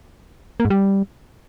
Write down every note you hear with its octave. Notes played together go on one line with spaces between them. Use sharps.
A#3
G#2
G3